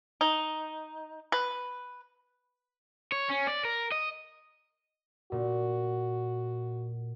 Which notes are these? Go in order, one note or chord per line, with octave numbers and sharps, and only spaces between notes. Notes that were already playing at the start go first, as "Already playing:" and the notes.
D#4
B4
C#5
C#4
D5
A#4
D#5
A#2 F#4